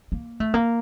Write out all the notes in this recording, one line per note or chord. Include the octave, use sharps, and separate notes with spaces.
A#3
A3
A#3